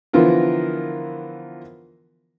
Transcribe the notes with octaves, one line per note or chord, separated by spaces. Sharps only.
D3 E3 F3 B3 F4 A#4